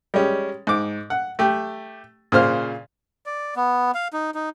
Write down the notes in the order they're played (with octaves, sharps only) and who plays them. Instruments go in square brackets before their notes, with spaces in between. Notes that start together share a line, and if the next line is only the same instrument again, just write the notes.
[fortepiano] G3 G#3 C#4
G#2 D6
F#5
A3 G4
A#2 C#3 C5 F6
[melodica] D5
B3
F5
D#4
D#4